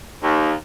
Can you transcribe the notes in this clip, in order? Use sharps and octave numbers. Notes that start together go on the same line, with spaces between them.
D#2